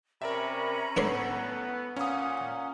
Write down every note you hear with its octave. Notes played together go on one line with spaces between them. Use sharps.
C3 C#4 A#4 D5 E5 A#5 B5
A2 B3 D4 A4 B4 C#5 C7
A#2 C#4 F#5 D#6